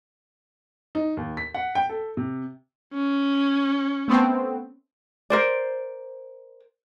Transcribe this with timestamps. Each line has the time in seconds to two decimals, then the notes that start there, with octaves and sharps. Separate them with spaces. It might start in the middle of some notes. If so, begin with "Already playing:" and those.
0.95 D#4
1.17 D#2
1.37 B6
1.54 F#5
1.75 G5
1.89 A4
2.17 C3
2.94 C#4
4.08 A3 B3 C4
5.30 A#4 C5 D5